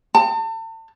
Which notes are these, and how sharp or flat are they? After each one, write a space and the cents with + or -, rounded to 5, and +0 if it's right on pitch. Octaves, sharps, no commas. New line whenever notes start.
A5 +40